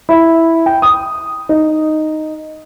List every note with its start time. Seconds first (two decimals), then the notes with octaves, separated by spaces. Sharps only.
0.09 E4
0.66 G5
0.82 D#6
1.49 D#4